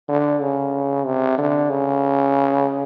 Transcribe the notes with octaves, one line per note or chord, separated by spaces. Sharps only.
D3
C#3
C3
D3
C#3